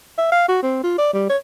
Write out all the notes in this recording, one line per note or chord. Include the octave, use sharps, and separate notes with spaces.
E5
F5
F#4
C4
F4
D5
G3
C#5